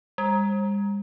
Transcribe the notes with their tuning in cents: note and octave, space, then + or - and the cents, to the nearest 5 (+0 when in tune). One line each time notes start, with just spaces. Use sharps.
G3 +45